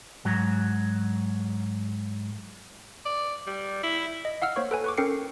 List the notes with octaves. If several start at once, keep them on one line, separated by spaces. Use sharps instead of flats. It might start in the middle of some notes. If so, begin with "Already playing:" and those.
G#2 F#3
D5
G3
E4
D#5
F5 F#5 E6 F6
A#3 C5 C#5 C#6
A4 B4 G#5
B4 C#6 D6
C#4 A4 A#4 G5 C7 C#7